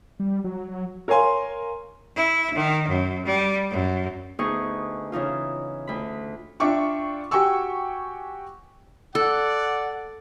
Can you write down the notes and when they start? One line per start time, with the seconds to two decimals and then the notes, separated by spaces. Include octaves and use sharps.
0.20 G3
0.44 F#3
1.08 A#4 C#5 F5 G#5 C6
2.14 E4
2.54 D#3
2.88 F#2
3.25 G3
3.69 F#2
4.39 D2 B3 D#4 G#4 D#5 C#6
5.12 C#3 E3 D#4 F4
5.87 D2 B5
6.60 D4 F4 E5 G5 C#6 D6
7.31 F#4 G4 G5 G#5 C#6 E6
9.15 A4 D5 F#5